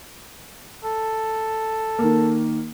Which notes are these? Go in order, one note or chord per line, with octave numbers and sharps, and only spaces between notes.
A4
D#3 A#3